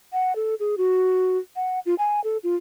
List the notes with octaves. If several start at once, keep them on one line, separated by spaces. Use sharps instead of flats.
F#5
A4
G#4
F#4
F#5
F4
G#5
A4
F4